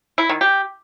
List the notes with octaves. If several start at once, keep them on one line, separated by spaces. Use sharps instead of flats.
E4
D#3
G4